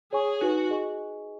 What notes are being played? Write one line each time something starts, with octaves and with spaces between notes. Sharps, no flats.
G#4 C#5 G#5 C#6
D#4 F#4 B4 G#5
G#4 D#5 G#5 C#6